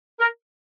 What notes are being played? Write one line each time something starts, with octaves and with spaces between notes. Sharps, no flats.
A#4